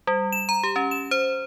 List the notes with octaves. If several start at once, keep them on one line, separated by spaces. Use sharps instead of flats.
G3
E7
A#5
G4
C#4
E7
C5